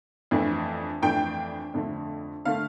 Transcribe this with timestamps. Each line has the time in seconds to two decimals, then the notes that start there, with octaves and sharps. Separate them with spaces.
0.31 F2 E3 A3 D4
1.02 F2 E3 A3 D4 G5
1.74 F2 D3 A3
2.45 D3 A3 F5